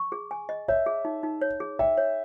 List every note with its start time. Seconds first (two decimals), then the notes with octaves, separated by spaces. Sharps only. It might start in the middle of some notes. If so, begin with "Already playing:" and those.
Already playing: C#6
0.12 G#4
0.31 G#5
0.49 D#5
0.68 C#5 E5
0.86 G#4
1.05 D#4
1.23 D#4
1.42 C#5
1.60 G#4
1.79 E5 G5
1.97 C#5